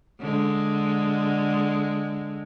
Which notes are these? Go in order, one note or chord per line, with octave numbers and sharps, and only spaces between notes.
D3 G#3